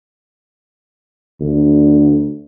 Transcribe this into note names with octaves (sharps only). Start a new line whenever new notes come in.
D2